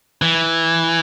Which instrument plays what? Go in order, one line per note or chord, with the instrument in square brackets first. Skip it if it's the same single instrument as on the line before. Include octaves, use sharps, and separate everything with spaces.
[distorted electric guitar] E3